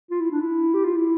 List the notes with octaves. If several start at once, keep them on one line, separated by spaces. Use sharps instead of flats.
F4
E4
D4
E4
G4
F4
E4